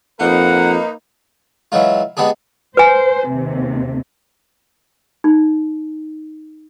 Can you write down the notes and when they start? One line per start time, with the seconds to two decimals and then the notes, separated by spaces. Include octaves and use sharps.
0.20 F2 A#3 D#4 B4 F#5
1.72 E3 F#3 G#3 F4
2.17 G#3 B3 D4 G4 G#4
2.77 B4 C5 G#5
3.28 D#2 C3
5.24 D#4